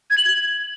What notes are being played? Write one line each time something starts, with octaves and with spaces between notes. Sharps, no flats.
G#6
F#7
G#6